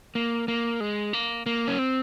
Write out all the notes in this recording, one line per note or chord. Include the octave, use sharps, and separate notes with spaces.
A#3
A#3
G#3
A#3
A#3
C#4
C4